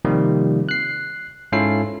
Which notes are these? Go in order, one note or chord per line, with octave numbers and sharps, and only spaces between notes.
C3 D#3 F3 G3 A#3
F#6 C7
G#2 C#4 E4 F4 A4 C7